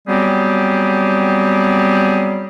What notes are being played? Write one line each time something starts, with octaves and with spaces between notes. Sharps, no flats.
F#3 G3 B3 C4 G4 G#4